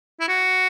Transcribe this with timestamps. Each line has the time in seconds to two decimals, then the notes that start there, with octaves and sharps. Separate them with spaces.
0.20 E4
0.29 F#4